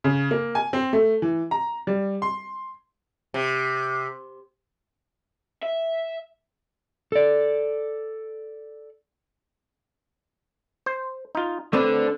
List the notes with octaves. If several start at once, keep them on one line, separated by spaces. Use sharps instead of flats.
C#3
A#3
G#5
C4
A3
E3
A#5
G3
C6
C3
E5
A4 D5
C5
D#4 F4
D3 A3 C4 D4 B4 D5